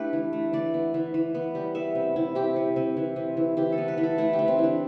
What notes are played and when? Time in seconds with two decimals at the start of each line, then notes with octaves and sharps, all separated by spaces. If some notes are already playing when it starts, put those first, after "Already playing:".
Already playing: A3 D4 E4 G4 B4
0.13 E3
0.33 A3
0.53 E3 D5
0.74 B3
0.94 E3
1.14 E3
1.34 B3
1.55 G3
1.75 B3 E5
1.95 C3
2.16 C3 E4
2.35 C3 G4
2.56 C3
2.76 C3
2.97 E3
3.16 C3
3.37 E3
3.57 E3 G4
3.72 A4
3.78 B3
3.88 B4
3.98 E3
4.03 A4
4.18 A3 E4
4.33 G4
4.39 E3
4.48 C4
4.59 E3 D4